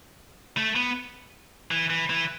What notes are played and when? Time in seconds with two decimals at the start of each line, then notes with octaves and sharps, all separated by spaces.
0.57 A3
0.76 B3
1.71 E3
1.90 E3
2.10 E3